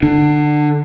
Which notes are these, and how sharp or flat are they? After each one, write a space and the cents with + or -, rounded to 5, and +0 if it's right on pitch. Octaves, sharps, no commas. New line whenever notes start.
D3 +15 D4 +25